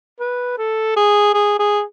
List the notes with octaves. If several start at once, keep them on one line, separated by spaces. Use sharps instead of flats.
B4
A4
G#4
G#4
G#4